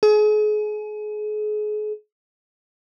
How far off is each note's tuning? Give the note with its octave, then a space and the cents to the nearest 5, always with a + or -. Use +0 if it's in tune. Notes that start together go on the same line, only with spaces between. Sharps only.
G#4 +35